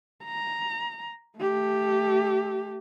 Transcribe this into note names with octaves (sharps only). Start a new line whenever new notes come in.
A#5
A3 G4